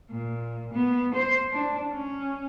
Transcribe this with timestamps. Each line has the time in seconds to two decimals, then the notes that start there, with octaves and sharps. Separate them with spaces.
0.11 A#2
0.73 B3
1.14 C5
1.52 D4
1.94 C#4